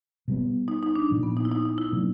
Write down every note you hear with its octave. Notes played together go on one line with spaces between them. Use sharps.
B2 G3 B3
D#4
D#4
D4
A#2 F3 A#3 D4
B3
D#4
E4
D#4
D#4
E4
B2 F#3 A#3 D4